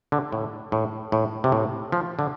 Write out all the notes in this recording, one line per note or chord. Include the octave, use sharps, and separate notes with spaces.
D3
A2
A2
A2
C3
A2
F3
D3